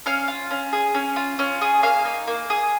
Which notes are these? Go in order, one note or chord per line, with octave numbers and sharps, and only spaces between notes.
C#4 F5
F4
C#4
G#4
C#4
F4
C#4
G#4
A#3 F5
D#4
A#3
G#4